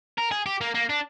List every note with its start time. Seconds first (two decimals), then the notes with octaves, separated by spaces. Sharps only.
0.18 A#4
0.31 G#4
0.46 G4
0.61 A#3
0.74 A#3
0.89 D4